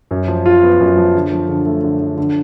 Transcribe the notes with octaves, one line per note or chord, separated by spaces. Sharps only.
F#2
F3
F4
B3
F#2
F3
D3
F3
D3
A3
D3
F3
D3